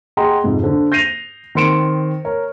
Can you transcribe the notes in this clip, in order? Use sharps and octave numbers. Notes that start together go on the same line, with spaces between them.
G#4 D#5 F#5 G5 A#5 C6
F2 G#2 C3
D3 C5
G6 A#6 C7 D#7 F7
D#3 C4 C6 C#7 D7 E7
A#4 C#5